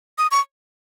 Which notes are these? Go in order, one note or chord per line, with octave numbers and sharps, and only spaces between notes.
D#6
C#6